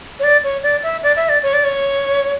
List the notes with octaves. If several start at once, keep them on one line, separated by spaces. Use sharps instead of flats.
C#5
D5
C#5
D5
E5
D5
E5
D5
C#5
D5
C#5